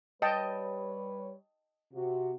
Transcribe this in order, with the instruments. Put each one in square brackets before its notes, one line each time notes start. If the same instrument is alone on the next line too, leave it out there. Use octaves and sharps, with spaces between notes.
[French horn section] G3 B4 C#5 [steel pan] D#5 G5 A5
[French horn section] C3 F#4